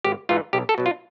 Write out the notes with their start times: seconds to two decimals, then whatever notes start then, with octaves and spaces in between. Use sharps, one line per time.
0.04 G#1 G4
0.29 G#2 E3 F4
0.53 B1 G4
0.69 A4
0.78 B2 F#3
0.86 F4